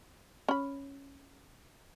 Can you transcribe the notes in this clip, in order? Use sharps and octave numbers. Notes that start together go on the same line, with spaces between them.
C#4 B5